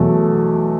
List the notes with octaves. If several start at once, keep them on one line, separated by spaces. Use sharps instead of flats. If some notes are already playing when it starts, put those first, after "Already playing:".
Already playing: E2 B2 F#3 A3